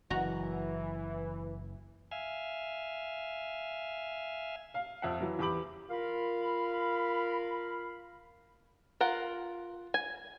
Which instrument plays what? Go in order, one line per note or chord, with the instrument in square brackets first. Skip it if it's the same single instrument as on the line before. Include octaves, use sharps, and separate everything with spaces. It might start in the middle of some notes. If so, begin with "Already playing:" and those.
[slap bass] F#1 [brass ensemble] E3 [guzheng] F#4 A#5
[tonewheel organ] E5 F5 G#5
[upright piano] F5
F2 E5 F#5
E3 F#3
E2 G4 B5 D6 F#7
[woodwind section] F4 A#4 F5 B5
[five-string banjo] F4 A#4 F#5
G#5